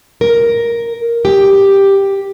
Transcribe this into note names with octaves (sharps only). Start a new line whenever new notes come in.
A#4
G4